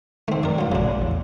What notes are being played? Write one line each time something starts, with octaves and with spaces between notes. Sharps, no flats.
D#3 A3 C4
F#2 A#4 D5
F#3 F4
A#1 C#3 D4
A1
E2